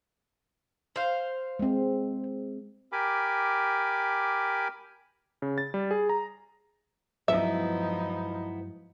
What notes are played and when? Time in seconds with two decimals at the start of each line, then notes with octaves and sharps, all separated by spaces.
0.96 C5 F5
1.59 G#3 C4
2.92 G4 A#4 G#5 B5 D6
5.42 C#3
5.58 A6
5.74 G3
5.91 G#4
6.09 A#5
7.28 G2 F3 F#3 G#3 B3 D#4 E4 E5